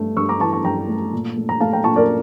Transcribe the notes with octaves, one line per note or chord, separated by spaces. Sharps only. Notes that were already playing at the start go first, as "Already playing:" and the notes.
Already playing: G2 A3
G2 C#6 E6
A#5 D6
E3 A5 C#6
A5 C#6
G2 G5 A#5
A3
A#2
A3
A#5
A3 F5 A5
G5 A#5
A#2 A5 C#6
A#4 D5